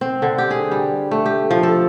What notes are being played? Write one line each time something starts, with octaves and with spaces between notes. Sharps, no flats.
C4
D3
G4
G#4
G3
A3
G4
F3
A4